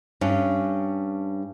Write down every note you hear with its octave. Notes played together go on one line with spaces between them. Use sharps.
G2 C#4